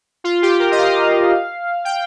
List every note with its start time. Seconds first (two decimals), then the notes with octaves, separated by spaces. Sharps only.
0.24 F4
0.42 G4
0.60 A#4
0.72 D#5
0.78 F5
1.85 G5